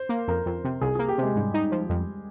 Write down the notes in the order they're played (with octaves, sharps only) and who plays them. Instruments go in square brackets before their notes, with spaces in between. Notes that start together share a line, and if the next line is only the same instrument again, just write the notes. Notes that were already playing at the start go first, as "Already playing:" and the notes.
Already playing: [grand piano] C5
[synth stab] A#3
[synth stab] F2 [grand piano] A#4
[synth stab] F2
C3
[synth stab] C2 [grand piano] G#4
[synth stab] A#3 [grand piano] G#4
[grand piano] G4
[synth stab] C3 [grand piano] G#3
[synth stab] G#2 [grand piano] G3
[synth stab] D#4
F3
F2